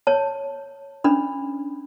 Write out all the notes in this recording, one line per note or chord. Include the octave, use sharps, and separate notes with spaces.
C#5 A5
C#4 D4 B5